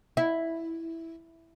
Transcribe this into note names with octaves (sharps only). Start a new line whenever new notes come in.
E4